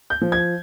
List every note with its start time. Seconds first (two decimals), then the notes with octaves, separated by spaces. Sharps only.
0.10 G6
0.21 F3
0.32 G#6